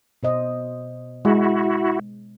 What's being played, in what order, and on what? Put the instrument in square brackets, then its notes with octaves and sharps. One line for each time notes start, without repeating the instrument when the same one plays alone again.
[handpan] B2 C5 D#5
[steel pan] G#3 [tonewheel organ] E4 F#4